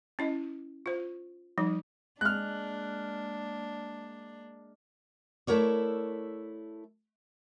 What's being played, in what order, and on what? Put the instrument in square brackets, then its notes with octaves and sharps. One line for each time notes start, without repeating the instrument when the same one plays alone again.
[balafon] C#4 E4 D#5
F4 C5
F3 G3 D#4
[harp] G#3 [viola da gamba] A#3 D4 [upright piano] F6 F#6
[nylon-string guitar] A3 E4 A#4 C#5 D5